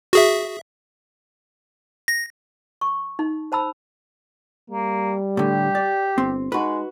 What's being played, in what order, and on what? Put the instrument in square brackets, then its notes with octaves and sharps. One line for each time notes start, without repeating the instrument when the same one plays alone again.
[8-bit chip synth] F#4 G#4 E5
A#6
[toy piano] C#6
D#4
C5 A5 B5 E6
[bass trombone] G3 [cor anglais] A#3
[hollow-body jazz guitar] A2 D3 [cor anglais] G4
[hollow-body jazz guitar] D5
[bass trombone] G1 [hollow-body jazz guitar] C4
[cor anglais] G#3 [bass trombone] D#4 [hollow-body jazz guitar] F#4 B4